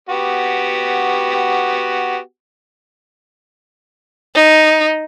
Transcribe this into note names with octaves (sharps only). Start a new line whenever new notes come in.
B3 F#4 G4
D#4